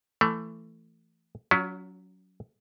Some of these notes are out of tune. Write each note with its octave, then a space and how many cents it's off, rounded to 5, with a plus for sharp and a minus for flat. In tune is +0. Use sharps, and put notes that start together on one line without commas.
E3 +20 A3 +15
F#3 +0 C#4 +30 F4 +40